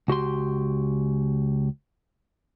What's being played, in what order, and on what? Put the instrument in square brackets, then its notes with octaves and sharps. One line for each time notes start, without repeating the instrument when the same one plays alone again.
[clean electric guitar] C#2 F#4 G4 C6